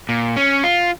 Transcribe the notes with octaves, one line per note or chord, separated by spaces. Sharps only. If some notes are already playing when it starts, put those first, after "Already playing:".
A#2
C#4
F4